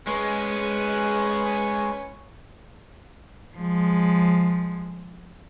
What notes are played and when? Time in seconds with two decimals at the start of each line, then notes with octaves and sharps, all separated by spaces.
0.08 G#3 C#4 B4 C#6
3.57 F3 G#3